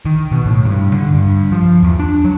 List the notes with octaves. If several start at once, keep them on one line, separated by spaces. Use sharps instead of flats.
D#3
B2
A2
G2
D3
G2
F3
E2
D4
F#3